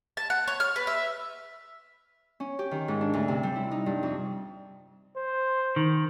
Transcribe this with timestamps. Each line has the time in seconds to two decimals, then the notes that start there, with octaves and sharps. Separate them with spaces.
0.17 A5
0.30 F#5
0.47 C#5
0.60 F6
0.76 B4
0.87 E5
2.40 C#4
2.59 G4
2.71 D#3
2.88 G#2
3.01 D4
3.14 D2
3.28 C3
3.43 G3
3.56 E4
3.71 D#4
3.86 G2
4.03 F2
5.16 C5
5.76 D#3